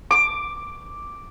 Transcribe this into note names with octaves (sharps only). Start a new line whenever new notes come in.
D6